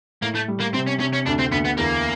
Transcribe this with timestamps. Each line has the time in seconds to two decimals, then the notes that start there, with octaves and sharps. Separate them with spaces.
0.22 A2 A#3
0.35 A3
0.48 G3
0.60 A#3
0.74 C3 C4
0.87 C#4
1.00 C3 C#4
1.13 C#4
1.26 D2 D4
1.39 C4
1.52 D2 B3
1.65 B3
1.77 E2 A#3